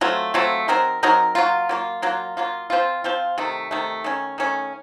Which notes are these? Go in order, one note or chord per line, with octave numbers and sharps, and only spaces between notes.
F#3 A3 C4 F4
F#3 A3 C4 F4
F#3 C4 D#4 A#4
F#3 C4 D#4 A#4
F#3 A#3 F4
F#3 A#3 F4
F#3 A#3 F4
F#3 A#3 F4
F3 C4 F4
F3 C4 F4
C3 D#3 A3
C3 D#3 A3
D#3 A3 C#4
D#3 A3 C#4